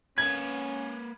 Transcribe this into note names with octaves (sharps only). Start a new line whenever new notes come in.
A#3 C#4 B4 G#6